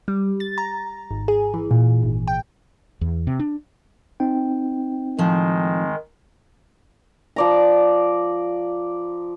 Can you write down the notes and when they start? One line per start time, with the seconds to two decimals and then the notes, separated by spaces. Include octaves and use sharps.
0.08 G3
0.40 A6
0.58 A#5
1.11 G#1
1.28 G#4
1.54 E3
1.71 A#2
2.03 G#1
2.28 G5
3.01 E2
3.27 C3
3.39 D4
4.20 C4 D#4 G5
5.18 A2 D#3 F3 G#3
7.36 F3 D5 A#5